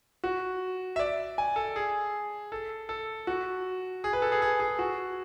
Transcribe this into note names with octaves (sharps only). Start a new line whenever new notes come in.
F#4
E5
D5
G#5
A4
G#4
A4
A4
F#4
G#4
B4
A4
G#4
G#4
G#4
F#4